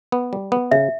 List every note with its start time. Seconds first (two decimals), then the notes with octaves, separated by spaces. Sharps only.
0.12 B3
0.33 G3
0.52 B3
0.71 C#3 E5